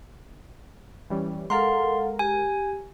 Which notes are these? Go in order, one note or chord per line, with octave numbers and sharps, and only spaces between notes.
E3 G3 C#4
G#3 A4 A#4 F5 F#5 C6
G4 G#5